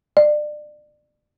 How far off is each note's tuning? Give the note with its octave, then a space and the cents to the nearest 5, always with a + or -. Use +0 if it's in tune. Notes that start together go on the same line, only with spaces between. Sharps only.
D5 +30